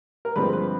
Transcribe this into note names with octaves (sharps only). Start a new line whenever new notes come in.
A#4
G2 D3 F3 G#3 C4 B4
B4